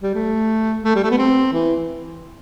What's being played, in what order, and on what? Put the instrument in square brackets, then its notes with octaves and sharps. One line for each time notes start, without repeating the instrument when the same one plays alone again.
[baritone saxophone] G3
A3
A3
G3
A3
B3
C4
E3